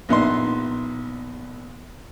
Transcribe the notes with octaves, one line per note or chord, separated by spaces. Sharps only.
A#1 B3 D#4 C6